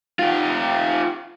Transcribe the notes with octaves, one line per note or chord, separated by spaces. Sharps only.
F4 G4